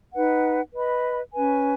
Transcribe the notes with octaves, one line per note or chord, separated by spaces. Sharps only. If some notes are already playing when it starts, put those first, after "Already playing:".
D#4 B4 F#5
B4 D#5 B5
C#4 B4 G#5